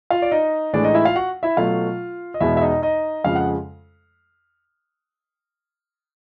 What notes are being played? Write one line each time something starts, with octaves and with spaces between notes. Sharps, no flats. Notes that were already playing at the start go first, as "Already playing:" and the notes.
F4 F5
D5
D#4 D#5
A2 E3 G#3 D4 D5
D#4 D#5
E4 E5
F4 F5
F#4 F#5
E4 E5
B2 F#3 A3 F4 F5
D#5
E2 B2 G#3 E4 E5
E5
D#4 D#5
D#4 D#5
F2 C#3 F3 G#3 F5
F#5